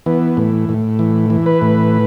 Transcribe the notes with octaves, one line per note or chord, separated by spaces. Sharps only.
E3 B3
A2
A2
E3
E3
B4
A2